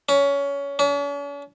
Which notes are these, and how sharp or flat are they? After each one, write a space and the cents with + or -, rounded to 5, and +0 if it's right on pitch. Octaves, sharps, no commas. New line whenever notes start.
C#4 +20
C#4 +45